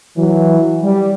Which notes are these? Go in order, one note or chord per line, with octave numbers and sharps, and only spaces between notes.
E3 F#3
G3